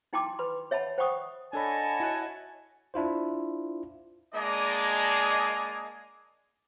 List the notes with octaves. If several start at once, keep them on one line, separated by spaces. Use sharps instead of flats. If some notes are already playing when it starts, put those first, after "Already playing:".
D#4 E4 G5 A5 C6 D6
B4 B5 C6
C#5 E5 F#5 A5 B5
C5 F#5 G5 B5 C#6 D#6
D4 A4 C#5 D#5 F#5 G#5 A5 B5
E4 F#4 F#6
D4 E4 F4 C5
G#3 A#3 D4 D5 D#5 G#5